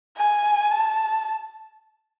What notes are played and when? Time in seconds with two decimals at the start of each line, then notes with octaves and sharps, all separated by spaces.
0.17 G#5
0.71 A5